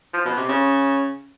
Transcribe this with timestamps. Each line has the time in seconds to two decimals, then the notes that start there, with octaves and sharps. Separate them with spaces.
0.13 F3
0.25 B2
0.37 C3
0.49 C#3